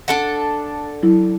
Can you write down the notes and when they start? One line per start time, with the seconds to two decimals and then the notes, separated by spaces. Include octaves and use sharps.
0.08 D4 A4 F#5
1.03 F#3 E4